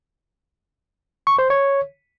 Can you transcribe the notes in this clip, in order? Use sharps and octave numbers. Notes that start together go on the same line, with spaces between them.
C#6
C5
C#5